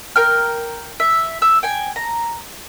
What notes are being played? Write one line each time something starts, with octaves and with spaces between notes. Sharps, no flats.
A#4 G5 F6
E5
E5 E6
G5 G#5
A#5